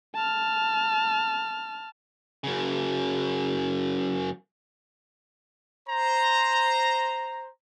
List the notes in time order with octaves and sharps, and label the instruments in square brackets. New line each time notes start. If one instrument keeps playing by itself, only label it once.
[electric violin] A5 F6
[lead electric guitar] F#2 C#3
[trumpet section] C5 A#5